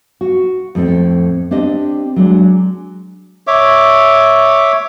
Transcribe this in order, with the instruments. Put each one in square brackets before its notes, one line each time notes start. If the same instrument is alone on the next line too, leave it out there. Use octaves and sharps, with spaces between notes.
[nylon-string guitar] F#4
F2 A2 C4
C4 D4 G4 D#5
F#3 G#3 D4
[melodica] C#5 E5 D6